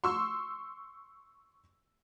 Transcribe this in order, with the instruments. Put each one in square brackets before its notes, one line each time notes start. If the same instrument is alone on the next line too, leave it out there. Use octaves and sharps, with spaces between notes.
[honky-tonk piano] C6 C#6 E6